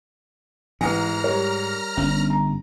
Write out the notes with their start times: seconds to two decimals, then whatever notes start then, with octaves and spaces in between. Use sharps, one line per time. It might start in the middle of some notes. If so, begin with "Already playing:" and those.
0.81 A1 G#2 B4 G5 G#5 A#5 F6 A#6
1.24 G3 A#4 C#5
1.97 G1 C#4
2.30 A#5